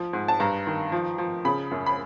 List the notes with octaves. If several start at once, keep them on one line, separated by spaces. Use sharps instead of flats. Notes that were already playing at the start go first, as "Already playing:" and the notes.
Already playing: F3
G#2
A5
G2 A#5
D#3
F3
F3
C#3 B5
F#2
B5